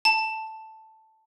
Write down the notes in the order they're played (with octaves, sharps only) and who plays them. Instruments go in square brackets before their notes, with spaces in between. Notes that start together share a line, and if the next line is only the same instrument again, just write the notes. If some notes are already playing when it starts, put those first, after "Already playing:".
[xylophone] A5